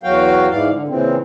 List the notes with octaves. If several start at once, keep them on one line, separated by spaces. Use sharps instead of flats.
E2 F#3 F#4 F5 G5
G#2 E3 D5 F5
D3
A#2 C#3 E3 C4